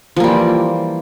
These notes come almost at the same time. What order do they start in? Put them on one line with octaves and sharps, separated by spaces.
F3 A#3 G3 E3